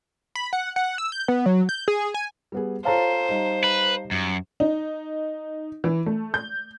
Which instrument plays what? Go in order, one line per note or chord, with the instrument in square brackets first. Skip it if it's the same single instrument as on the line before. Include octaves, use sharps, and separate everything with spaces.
[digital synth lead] B5
F#5
F#5
E6
G6
B3
F#3
G6
G#4
G#5
[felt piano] G3 B3 G#4
[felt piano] F4 A4 C#5 [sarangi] C5 [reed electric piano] F5 A5 A#5
[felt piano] G3 D#4
[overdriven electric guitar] B4
F#2
[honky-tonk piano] D#4
E3
A3
G6